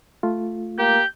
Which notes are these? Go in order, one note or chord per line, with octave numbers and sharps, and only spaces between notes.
A3 F4
A#3 G4 G6